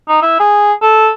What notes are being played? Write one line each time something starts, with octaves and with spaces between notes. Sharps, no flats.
D#4
E4
G#4
A4